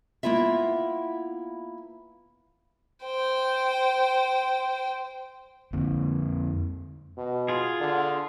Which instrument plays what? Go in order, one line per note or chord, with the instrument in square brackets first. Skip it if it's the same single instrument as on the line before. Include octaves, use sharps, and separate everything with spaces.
[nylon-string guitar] A#3 B3 E4 F4 E5
[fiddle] C5 G5
[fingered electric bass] F2 D3 A#3 C4
[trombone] B2
[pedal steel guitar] F4 G#4
[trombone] D3